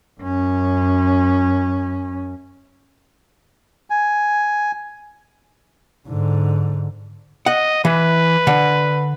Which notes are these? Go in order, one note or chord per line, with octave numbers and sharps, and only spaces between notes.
F#2 C#4
G#5
G#2 D3
D#5 F#5
E3 B4
D3